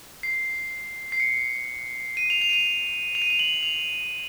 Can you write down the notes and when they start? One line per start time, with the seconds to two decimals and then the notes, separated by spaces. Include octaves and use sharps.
0.23 C7
1.12 C7
1.20 C#7
2.17 D#7
2.30 F7
2.42 F7
2.49 D#7
2.53 F7
3.15 F7
3.22 D#7
3.30 F7
3.39 F#7
3.63 F7